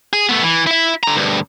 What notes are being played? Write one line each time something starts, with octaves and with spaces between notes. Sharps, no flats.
G#4
A3 B3
E3
E4 E5
D3 A#5
D2 G2